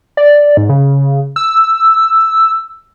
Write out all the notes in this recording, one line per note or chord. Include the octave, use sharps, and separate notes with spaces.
D5
G#2
C#3
E6